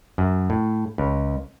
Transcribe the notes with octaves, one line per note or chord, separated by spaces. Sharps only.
F#2
A2
C#2